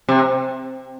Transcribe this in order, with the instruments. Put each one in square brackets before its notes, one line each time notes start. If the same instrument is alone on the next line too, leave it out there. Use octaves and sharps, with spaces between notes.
[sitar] C3